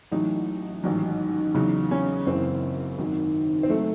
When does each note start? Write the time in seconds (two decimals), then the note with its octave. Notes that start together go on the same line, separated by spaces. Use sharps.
0.12 A1 A2 F#3 D#4
0.84 A1 G#2 D#3 F#3
1.54 E2 C#3 F#3 D#4
1.91 C#4
2.26 F#1 F#2 C#3 E3 C4
2.98 G#1 F#2 D#3 F#3
3.63 C4
3.69 D#3 F#3 A3